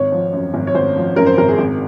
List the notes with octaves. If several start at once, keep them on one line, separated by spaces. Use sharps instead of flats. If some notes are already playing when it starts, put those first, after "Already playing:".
Already playing: G#1 C#5
F3
F#2
G#1
C#5
G#1 C5
F3
F#2 A#4
C5
G#1 A#4
G#4
G#1